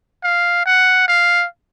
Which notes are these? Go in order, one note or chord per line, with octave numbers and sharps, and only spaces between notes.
F5
F#5
F5